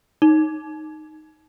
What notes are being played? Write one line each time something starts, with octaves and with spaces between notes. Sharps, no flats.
D#4